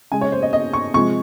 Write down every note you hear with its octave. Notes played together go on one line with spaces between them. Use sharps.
C#3 G#3 G#5
C#5
C5
D#5
D#5
C#6
C3 F3 G#3 C#6